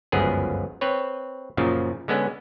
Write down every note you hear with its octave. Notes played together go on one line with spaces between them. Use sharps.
G1 C#2 F#2 F3 B3 G#4
C4 B4 C#5
F#2 A#2 C#3 F3
D3 G#3 B3 C#4